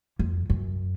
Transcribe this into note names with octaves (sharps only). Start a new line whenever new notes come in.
F2
F#2